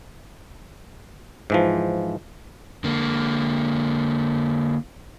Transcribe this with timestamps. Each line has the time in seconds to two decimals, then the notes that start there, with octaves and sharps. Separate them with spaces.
1.50 G#2 E3 F3
2.84 D3 A#3